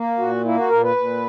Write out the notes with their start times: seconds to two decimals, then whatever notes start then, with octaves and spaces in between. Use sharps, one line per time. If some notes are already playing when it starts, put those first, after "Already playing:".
Already playing: A#3
0.19 A#2 F#4
0.44 A#3 E4
0.57 F#4
0.70 A#2 A#4
0.83 B4
0.96 A#2